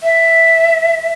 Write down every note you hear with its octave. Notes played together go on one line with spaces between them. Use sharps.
E5